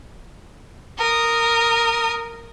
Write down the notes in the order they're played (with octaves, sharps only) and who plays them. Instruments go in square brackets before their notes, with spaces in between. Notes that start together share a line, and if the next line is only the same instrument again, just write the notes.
[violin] A#4 D#6